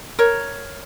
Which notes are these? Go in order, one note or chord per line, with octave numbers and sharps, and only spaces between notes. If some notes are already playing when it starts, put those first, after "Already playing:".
A#4 C#5